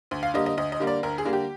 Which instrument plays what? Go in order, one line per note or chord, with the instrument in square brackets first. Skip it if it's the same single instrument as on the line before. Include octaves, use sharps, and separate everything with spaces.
[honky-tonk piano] D2
F5
D3 G3 A#3 D#5
D#5
D2 D#5
D#5
D3 G3 A#3
D5
D2 A#4
G#4
D3 G3 A#3
G4